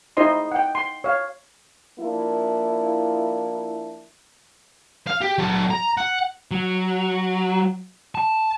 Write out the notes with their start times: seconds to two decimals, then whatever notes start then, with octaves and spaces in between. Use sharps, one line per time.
0.17 D#4 E4 C5 D#5 C6
0.52 F#5 G5
0.75 C6
1.04 C#5 F5
1.99 F3 A#3 D4 E4
5.07 F5
5.21 G4
5.38 F#3 A4
5.70 A#5
5.98 F#5
6.51 F#3
8.15 A5